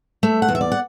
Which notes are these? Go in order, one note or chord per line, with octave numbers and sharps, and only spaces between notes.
A3 E5
F#5
E2
E5
D5
F#5